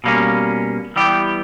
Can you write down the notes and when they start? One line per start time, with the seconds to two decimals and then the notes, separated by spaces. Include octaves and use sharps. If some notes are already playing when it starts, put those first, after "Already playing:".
0.04 B2 G3 A#3 C#4
0.96 E3 G3 B3 G4